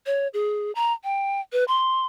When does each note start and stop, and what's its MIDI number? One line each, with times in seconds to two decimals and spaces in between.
0.06 0.28 73
0.34 0.72 68
0.75 0.93 82
1.04 1.41 79
1.53 1.64 71
1.68 2.07 84